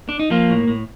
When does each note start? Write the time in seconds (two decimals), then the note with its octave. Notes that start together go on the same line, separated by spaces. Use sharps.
0.09 D4
0.19 D#4
0.30 F3 A#3 F4
0.50 A2
0.68 A2